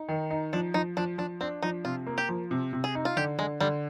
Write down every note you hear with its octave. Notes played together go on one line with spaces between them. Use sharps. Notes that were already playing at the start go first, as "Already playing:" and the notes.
Already playing: D#4
D#3
D#4
F3 D4
F3 D#4
F3 D4
F3 D4
C4 D4
F3 D#4
C3 F4
A#3
G4
F3
C3
C3
G#4
D#4
F4
D3 G4
D3 G#3
D3 G3